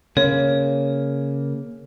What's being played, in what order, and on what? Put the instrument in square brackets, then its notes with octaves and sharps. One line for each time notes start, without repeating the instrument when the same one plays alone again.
[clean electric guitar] C#3 A#3 [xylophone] C#5